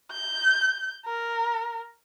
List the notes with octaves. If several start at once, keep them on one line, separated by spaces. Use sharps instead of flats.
G6
A#4